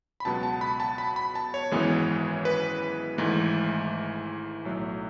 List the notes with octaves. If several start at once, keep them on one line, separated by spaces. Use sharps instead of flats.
B5
C#2 B2 F#3 B3 A5
A5
B5
A5
B5
B5
A5
C#5
G#1 F#2 E3 G#3 B3
B4
G#1 G#2 E3 A3
B1 A2 F#3 A3